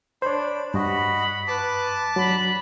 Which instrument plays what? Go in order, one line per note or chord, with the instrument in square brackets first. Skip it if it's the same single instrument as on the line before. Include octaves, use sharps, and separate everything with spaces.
[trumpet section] D4 [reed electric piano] C5 C#5 [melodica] B5
[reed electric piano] G2 [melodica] F#4 D#5 [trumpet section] F#5 B5
[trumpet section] B4 [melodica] A5 D6
[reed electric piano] F#3 [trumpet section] D4 B5